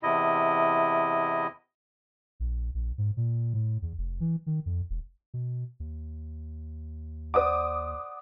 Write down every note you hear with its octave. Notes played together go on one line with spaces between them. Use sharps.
E2 C3 E4 D#5
A#1
A#1
G#2
A#2
A2
E2
F1
E3
D#3
F2
E1
B2
D#2
C5 D5 F#5 D6 D#6